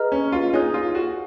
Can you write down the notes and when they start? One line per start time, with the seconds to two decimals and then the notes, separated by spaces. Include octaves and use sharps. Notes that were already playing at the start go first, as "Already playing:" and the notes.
Already playing: G#4 B4 D#5 A#5 F6
0.12 C#4
0.32 F4
0.53 D#4 G#4 C#5 G#5 D#6 F#6
0.74 F4
0.95 F#4